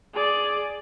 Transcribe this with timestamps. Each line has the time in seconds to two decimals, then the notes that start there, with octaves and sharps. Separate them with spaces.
0.13 G#4 D5